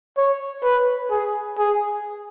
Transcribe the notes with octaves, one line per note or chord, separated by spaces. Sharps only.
C#5
B4
G#4
G#4